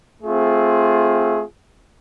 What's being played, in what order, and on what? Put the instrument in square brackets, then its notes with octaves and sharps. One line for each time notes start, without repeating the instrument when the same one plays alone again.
[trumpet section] A3 C4 F4 G#4